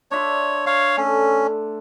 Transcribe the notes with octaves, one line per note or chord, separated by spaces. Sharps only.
D4 C#5 E5 C6
C#5 F5
A3 C#4